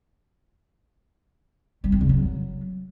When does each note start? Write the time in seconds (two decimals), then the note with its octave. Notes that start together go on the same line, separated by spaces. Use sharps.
1.84 G3
1.92 C4
2.01 C#3
2.09 F#3